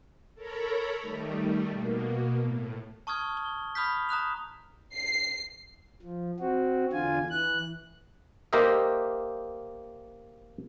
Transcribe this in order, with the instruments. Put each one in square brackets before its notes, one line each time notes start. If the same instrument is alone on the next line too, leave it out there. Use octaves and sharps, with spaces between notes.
[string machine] A4 A#4 C#5 A#5 B5
D#3 G3 A3
B2 A#3
A2
[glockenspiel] A5 C#6 D#6 F6 G#6
G7
B5 D#6 F6 G6 B6
A#5 D#6 F#6 F7
[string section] C7
[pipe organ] F3
C4 F#4
E2 D3 F4 G#5
E3 F#6
[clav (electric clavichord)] A#3 G4 A#4 C5 D#5 E5